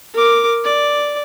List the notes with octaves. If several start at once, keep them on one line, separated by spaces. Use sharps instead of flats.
A#4 D6
D5